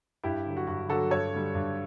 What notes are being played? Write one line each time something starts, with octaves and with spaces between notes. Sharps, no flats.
G2 E4 G4
D3 F#3
F#4
G2 F#4
D3 F#3 F#4 A4
G2 A4 C#5
D3 G3
G2